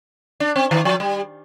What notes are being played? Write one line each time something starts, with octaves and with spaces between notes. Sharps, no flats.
D4
C4
D#3
F3
G3